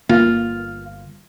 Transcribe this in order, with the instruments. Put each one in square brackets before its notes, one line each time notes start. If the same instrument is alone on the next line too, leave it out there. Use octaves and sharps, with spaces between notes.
[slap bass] G1 [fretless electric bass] A#3 [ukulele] F4